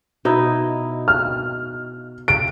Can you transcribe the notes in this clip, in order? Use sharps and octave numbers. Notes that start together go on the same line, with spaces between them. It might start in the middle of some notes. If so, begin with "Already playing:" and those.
B2 D#4 E4
F6
D7